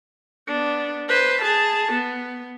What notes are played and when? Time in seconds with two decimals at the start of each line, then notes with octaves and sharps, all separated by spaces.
0.47 B3 D4
1.09 B4 C5
1.42 G#4 A5
1.92 B3